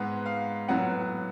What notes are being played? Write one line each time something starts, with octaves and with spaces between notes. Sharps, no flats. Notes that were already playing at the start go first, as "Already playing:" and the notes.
Already playing: G#2 G#3 B3 F#5
F5
A2 F#3 B3 F#5